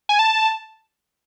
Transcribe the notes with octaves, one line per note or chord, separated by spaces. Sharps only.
G#5
A5